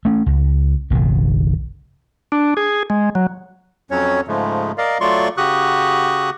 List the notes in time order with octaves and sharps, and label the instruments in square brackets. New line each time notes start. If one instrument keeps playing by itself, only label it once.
[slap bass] A3 C#4
C#2
F#1 B1 D#3
[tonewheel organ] D4
G#4
G#3
F#3
[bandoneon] F2 F#3 C#4 C#5
G#2 C#3 F3 G#3 A3
A#4 D5 D#5 F5
F#3 A3 F4 D5 C6 C#6
C#3 F#4 G4 C#6 D#6 F#6